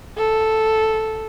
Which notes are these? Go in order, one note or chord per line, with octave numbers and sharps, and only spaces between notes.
A4